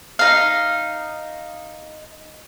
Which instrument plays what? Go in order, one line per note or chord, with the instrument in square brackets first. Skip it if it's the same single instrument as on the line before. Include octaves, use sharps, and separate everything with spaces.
[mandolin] D#4 F5